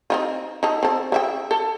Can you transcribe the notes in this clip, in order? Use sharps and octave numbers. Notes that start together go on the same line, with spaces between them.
C4 D#4 F4
D#4 A4
C4 A4
C#3 E5 G5
A4